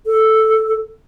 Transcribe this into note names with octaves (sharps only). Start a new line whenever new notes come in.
A4